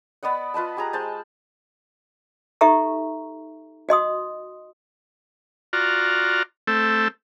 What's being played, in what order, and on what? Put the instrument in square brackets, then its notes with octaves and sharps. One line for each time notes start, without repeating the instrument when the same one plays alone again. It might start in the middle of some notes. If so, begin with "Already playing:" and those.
[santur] B3 D5 D#5 F#5
F4 B4 D#5 A5
G4 G#4 A#5
G#3 C5 A5
[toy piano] D#4 G4 A4 E5 A#5 C#6
F#4 D#5 C6 D#6
[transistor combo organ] F4 F#4 D5 A#5
A3 C4 A4